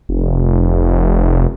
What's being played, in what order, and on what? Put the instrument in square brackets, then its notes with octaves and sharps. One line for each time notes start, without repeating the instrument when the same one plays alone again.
[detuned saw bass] F1